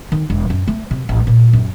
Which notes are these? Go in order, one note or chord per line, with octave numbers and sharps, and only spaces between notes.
D#3
E1
F#2
A3
C3
A1
A#2
F#2